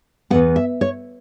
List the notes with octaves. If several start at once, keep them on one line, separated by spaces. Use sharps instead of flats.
E2 B2 B3 F#5
E5
C#5